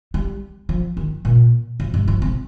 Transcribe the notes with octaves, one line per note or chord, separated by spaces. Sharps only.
G3
F3
D#3
A#2
F2
G2
F3
C3